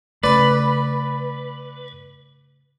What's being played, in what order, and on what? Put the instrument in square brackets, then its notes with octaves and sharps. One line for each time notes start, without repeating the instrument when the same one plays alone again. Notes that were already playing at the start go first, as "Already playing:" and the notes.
[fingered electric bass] C#3 A3 [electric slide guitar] B4 [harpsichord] D5 B5